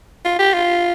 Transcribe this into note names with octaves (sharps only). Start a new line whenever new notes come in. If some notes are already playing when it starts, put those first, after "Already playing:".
F4
G4
F4